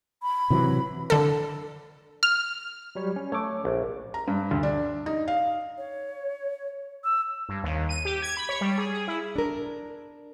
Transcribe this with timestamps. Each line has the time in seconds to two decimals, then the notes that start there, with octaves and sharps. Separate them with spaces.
0.22 B5
0.50 C3 E3 F#3
1.10 D3 A4
2.23 F6
2.95 F#3 G3 C#5
3.16 C#4
3.32 A3 C#5 D6
3.65 A#1
4.14 A#5
4.28 G2
4.51 D2
4.63 D4
5.06 D#4
5.28 F5
5.77 C#5
7.04 E6
7.49 G2
7.63 D#2
7.89 D#7
8.05 G4
8.22 G#6
8.37 B5
8.49 C#5
8.61 G3
8.78 G#4
8.93 G#4
9.08 E4
9.36 D4 A#4